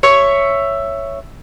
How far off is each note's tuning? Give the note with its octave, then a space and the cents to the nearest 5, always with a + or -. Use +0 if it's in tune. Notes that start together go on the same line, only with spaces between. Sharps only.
C#5 +0 E5 +10